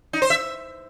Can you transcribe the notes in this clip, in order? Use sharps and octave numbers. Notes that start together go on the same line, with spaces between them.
D#4
C5
E5